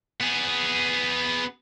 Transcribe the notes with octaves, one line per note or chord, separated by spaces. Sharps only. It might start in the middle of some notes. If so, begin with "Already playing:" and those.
B3 G#4